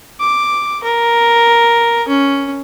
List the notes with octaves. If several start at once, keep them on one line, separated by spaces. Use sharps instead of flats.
D6
A#4
C#4